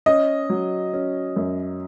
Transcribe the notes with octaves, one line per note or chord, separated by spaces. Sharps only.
C#4 D#5
F#3
C#4
F#2